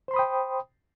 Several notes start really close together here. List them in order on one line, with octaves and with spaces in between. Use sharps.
C5 C6 B5 D#6 G5